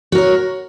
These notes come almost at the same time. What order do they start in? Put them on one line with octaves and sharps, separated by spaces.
F#4 A#4 C#5